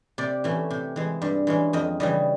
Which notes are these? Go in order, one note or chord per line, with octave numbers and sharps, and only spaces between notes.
C3 D5
E3 A3 C#4
C3
E3 G#3
G2
E3 G#3 C#4
F2 D#5
C#3 E3 G3 D#5